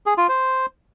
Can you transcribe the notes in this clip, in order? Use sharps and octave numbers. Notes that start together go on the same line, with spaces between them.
G#4
F4
C5